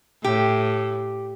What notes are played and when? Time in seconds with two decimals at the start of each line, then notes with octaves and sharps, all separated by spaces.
0.24 A2 G4